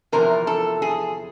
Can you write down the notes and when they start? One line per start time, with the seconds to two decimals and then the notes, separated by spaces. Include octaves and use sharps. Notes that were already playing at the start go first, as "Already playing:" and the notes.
0.12 E2 C3 F3 A#4
0.47 A4
0.82 G#4